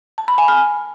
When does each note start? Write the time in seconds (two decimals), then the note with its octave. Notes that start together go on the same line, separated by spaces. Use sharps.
0.18 A5
0.28 B5
0.38 G#5
0.48 F6